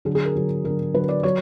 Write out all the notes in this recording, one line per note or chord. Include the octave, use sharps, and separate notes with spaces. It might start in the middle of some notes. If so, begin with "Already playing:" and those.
D3 F#3 G#4
G#4
A#4
D3 F#3
D3 F#3 A#4
D3 F#3 B4
D5
F#3 C#5